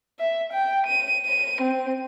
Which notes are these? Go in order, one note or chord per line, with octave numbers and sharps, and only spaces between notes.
E5
G5
D#7
D#7
C4